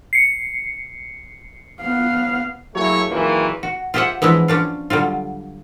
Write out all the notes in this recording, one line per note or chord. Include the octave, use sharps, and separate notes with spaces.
C7 C#7
B3 F5
F#3 A3 A#3 E4 G#4 C#5
F#2 A#2 D#3 E3 G#3 A#3
F#4
F4 G4 G#4 C5 E5 F#5
E3 F3 G#3 B3 D4 E4
C#4 D4 F4
D3 F#3 G3 F4